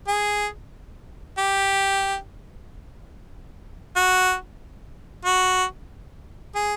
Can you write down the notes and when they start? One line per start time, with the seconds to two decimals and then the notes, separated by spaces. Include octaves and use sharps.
0.08 G#4
1.38 G4
3.96 F#4
5.25 F#4
6.55 G#4